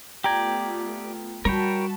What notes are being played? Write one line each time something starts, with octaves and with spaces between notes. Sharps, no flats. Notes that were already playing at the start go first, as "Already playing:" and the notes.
A3 B3 F4 G4 D5 G5 A#5 G#6
G3 F#4 A#4 C#5 G5 A5 B5